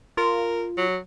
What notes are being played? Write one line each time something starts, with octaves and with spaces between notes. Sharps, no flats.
F4 A#4
F#3